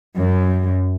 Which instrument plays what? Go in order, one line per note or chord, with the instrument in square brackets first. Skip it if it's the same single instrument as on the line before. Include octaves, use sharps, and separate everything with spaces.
[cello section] F#2